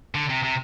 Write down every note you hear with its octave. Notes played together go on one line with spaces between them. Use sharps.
D3
C3
C3